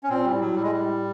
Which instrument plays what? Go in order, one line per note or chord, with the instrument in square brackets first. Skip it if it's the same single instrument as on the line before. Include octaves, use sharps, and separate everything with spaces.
[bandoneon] C#4
[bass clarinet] A#2 [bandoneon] C4
[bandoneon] G3
[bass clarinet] A2
[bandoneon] F#3
G3
G#3
G3